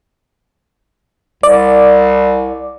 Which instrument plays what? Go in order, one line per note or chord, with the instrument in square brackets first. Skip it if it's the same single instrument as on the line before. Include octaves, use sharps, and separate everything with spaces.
[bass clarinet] C2 [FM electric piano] D5